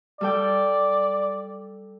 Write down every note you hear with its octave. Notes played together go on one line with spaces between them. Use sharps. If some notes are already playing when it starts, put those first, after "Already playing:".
G3 A4 D5 G5